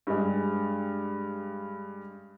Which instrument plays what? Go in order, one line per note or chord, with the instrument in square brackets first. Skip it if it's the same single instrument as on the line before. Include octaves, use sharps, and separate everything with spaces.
[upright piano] G2 G#3